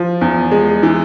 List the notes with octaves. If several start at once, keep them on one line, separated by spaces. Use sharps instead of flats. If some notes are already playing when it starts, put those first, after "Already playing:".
Already playing: F3
E2
G#3
E3